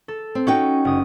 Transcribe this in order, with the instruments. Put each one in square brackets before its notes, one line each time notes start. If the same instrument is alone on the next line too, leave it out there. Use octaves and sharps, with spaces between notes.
[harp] A4
[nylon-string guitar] C4
[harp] C#4 [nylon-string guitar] D#4 F#4 G5
[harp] F#1 D#6